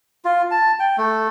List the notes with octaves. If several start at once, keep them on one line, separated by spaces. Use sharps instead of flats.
F4
A5
G5
A3